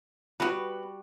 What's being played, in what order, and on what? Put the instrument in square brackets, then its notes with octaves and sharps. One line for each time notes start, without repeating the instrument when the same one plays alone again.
[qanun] G3 F#4 [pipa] B3 B4